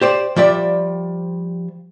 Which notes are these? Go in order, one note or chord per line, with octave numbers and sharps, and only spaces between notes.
G4 C5 D5
F3 G3 D5 E5